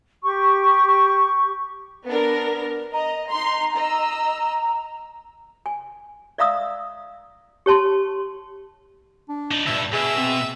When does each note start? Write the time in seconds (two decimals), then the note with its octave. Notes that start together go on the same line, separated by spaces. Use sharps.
0.23 G4 C#6
2.07 B3 D4 A#4
2.94 D#5 A#5
3.29 D#4 C6
3.76 D#5 E6
5.66 G#5
6.38 D5 E5 F5 A#5 D#6 E6
7.66 G4 C#5 A5 C6
9.29 D4
9.52 D#4 D5
9.66 C#2 G2 A#2 E5
9.93 B2 G#4 E5
10.18 C4